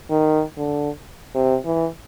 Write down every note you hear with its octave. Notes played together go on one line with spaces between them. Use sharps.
D#3
D3
C3
E3